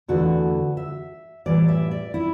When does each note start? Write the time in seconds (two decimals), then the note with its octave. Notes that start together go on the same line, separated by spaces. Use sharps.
0.08 E2 D3 A3 E4 F#4
0.77 E5
1.46 A2 E3 G3 D5
1.68 E5
1.91 D5
2.14 E4